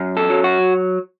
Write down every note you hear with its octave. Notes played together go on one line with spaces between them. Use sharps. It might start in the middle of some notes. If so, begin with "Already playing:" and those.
Already playing: F#2
A4
F#3
F#4